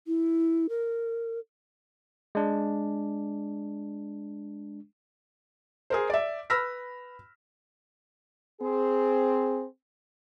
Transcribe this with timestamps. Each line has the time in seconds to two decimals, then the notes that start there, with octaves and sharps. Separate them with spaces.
0.07 E4
0.69 A#4
2.35 G#3 D4
5.90 G#4 A#4 C5
6.10 D5 E5
6.50 B4 B5 E6 F6 A#6 B6
8.61 C4 G#4